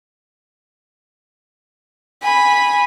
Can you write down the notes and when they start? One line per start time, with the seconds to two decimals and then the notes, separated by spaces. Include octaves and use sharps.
2.22 G#5 B5